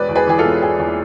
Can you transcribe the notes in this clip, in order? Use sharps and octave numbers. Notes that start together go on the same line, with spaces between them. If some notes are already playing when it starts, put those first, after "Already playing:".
Already playing: E1 B4 D5
E2
G#4 B4
E3 G#4
F4 A4
E1
E1 G#4
E2